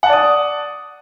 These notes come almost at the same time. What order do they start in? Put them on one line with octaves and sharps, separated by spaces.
F#5 A5 D5 D#6